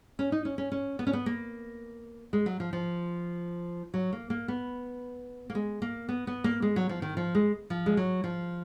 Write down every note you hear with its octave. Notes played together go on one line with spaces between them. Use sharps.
C#4
D#4
C#4
C#4
C#4
B3
C#4
B3
A#3
G#3
F#3
F3
F3
F#3
A#3
A#3
B3
A#3
G#3
A#3
B3
B3
A#3
G#3
F#3
F3
D#3
F3
G#3
F3
G#3
F#3
F3